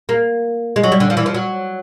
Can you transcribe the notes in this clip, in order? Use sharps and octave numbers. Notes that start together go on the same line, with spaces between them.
A#3
G#3
F#3
G3
D3
F3
E3
F3
F#3